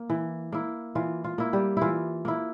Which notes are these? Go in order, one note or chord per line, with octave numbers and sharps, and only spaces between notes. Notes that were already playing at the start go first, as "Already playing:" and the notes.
Already playing: A#3
E3
A#3 E4
E3 F4
F4
A#3 E4
G3 G4
E3 E4 F4
A#3 E4